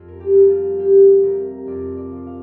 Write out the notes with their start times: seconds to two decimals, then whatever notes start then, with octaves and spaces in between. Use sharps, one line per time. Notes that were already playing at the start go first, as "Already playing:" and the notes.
Already playing: F2
0.08 A#4
0.20 G4
0.34 G3
0.49 F4
0.78 A#3 G4
1.23 C3 A#4
1.67 F2 D5
1.97 D5
2.12 F3
2.27 F5